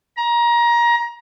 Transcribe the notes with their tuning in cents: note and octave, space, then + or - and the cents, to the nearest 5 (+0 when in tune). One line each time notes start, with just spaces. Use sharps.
A#5 +25